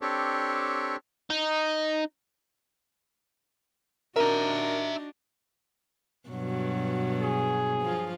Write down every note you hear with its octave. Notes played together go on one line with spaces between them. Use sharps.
C4 D4 G4 A4 C#5
D#4
D4 D#4 F#4 A#4 E5 A#5
G2 B2 F#3
G#4
F3 F4